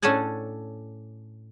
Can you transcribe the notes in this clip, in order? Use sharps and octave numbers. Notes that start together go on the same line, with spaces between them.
A2 C#4 D4 A4 F#5 G#5